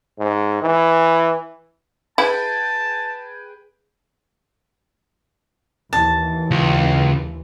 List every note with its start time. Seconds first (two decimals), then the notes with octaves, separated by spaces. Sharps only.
0.19 G#2
0.62 E3
2.18 E4 G#4 B4 G5 A5
5.93 D#2 E3 A5
6.51 C#2